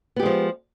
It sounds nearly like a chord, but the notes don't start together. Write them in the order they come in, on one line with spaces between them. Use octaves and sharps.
B3 G4 G#3 F3